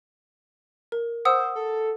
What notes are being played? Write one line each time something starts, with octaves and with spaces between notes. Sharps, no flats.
A#4
C5 F#5 D#6 E6
A4